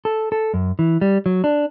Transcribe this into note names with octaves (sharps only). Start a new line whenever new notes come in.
A4
A4
F#2
E3
G3
F#3
D4